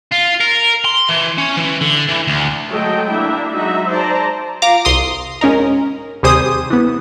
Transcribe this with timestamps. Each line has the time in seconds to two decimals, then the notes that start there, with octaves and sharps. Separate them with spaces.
0.12 F4
0.40 A#4
0.85 C6
1.09 E3
1.38 C#4
1.57 E3
1.81 D3
2.09 E3
2.27 D2
2.70 F#3 G#3 A3 A4 D#5 G5
3.11 A#3 D4 E4 E5
3.54 F#3 G#3 D#4 F#4 E5
3.89 C5 D5 A5 A#5
4.62 F4 F5 A#5 D6
4.85 C2 C6 D#6
5.41 G#2 C#4 D#4 A#4
6.23 D#2 C3 G3 G#4 C5 D#6
6.70 E3 B3